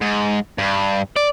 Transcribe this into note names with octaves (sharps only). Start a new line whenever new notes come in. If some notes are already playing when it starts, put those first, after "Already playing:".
G#2
G2
D5